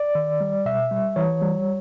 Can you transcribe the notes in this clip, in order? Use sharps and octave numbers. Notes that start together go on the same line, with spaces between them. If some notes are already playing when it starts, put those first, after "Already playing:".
Already playing: D5
D#3
G3
B2 E5
G3
E3 C#5
G3